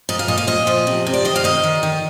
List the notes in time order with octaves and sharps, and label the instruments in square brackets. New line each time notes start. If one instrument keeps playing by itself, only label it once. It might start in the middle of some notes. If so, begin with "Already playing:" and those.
[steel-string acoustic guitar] A#2 D#5
F5
A#2 D#5
F5
A#2 D#5
F3
C3
C3
D5
D#3 D#5
F5
D#3 D#5
D#3
D#3